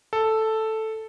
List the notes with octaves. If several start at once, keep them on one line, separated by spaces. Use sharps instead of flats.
A4